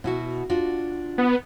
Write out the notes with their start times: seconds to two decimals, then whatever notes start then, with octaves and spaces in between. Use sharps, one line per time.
0.04 B2 E4 F#4
0.50 D4 F4 F#4
1.18 B3